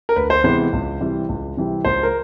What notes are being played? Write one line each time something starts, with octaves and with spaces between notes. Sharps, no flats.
A#4
D2 B4
C5
C3 E3 G#3 B3 C5
C#2
C3 E3 G3 C4
C#2
C3 E3 G3 C4
C#2 C5
A#4